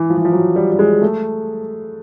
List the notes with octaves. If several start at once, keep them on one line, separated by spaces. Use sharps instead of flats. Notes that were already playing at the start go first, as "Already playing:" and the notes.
Already playing: E3
F3
E3
F3
F#3
G3
G3
G#3
A3